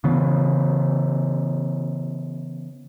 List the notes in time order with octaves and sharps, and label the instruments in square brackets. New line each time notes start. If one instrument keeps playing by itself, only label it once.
[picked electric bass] C#3 E3 B3